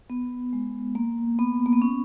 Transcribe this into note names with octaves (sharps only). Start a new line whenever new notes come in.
B3
G#3
A#3
B3
A#3
B3
C#4